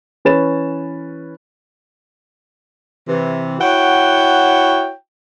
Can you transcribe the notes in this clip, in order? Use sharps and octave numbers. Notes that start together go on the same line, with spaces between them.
E3 C#4 B4 C#5 A6 E7
C3 E3
E4 F#4 C#5 F#5 G5